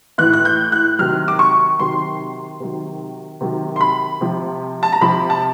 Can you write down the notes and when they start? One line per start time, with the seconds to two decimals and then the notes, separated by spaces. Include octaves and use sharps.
0.18 A2 E3 F#6
0.33 F#6
0.45 G6
0.72 F#6
0.99 C3 D#3 F#3 F6
1.28 D6
1.39 C#6
1.79 C3 D#3 F#3 C6
2.60 C3 D#3 F#3
3.41 C3 D#3 F#3
3.76 C6
3.81 B5
4.21 C3 F3
4.83 A5
4.93 A#5
5.01 C3 F3 B5
5.30 A5